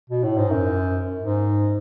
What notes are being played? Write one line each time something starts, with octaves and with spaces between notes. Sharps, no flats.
B2
A2
G#2
F#2
G#2